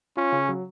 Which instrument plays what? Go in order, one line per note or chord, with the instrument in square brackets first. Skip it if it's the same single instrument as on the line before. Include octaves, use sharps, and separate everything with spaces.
[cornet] C#4 [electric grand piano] F4
[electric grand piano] C#3
F#3